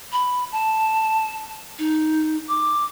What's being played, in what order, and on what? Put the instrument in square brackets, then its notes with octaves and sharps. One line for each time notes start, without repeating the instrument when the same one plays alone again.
[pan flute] B5
A5
D#4
D6